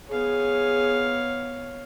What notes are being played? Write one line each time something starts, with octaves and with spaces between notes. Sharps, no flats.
B3 G#4 C#5 F5